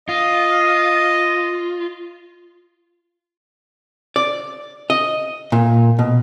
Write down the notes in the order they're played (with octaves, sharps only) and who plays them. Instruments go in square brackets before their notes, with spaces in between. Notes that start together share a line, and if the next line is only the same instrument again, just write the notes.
[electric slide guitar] F4 [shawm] D#5
[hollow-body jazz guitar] D5
D#5
A#2
B2